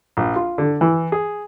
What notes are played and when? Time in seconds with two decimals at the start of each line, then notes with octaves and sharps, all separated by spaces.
0.17 A#1
0.36 F4
0.58 D3
0.81 E3
1.12 G#4